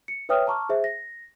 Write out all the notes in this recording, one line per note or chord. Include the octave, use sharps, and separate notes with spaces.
C#7
B4 C#5 E5 G5 D#6 F6
A5 A#5 C#6 D6 F6
G#4 C5 E5
A#6